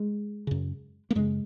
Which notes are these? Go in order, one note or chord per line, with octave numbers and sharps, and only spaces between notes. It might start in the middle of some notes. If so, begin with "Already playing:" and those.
Already playing: G#3
F#2 C#3
A#3
F#2 C#3 G#3